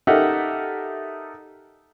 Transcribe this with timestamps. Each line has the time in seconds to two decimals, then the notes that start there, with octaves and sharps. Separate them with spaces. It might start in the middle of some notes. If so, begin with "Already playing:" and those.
0.07 D#4 G4 A4 A#4 E5 F#5